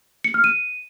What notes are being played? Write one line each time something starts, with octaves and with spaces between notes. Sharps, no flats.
C#7
F6
D#7